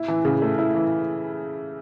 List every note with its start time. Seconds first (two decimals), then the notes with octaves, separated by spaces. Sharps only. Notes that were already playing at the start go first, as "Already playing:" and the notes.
Already playing: E4
0.08 E3
0.25 C#3
0.42 A3
0.58 E4
0.75 E3